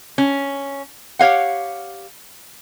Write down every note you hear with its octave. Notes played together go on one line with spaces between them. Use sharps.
C#4
G4 C#5 F5 F#5